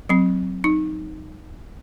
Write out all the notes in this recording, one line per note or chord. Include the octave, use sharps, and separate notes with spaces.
F#3 C4
D#4